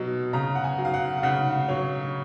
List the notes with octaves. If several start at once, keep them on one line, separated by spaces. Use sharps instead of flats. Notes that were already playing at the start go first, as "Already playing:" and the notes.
Already playing: B2 F#3
C#3 A#5
F#5
G#5
F#3
F5
F#5
F5
C#3 F#5
F#3 C#5